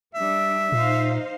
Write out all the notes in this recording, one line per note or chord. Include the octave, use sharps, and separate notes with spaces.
G3 D4 E5
A#2 D#4 C5 F5